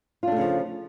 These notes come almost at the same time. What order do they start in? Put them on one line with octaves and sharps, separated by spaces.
F4 D4 A3 C#3 F3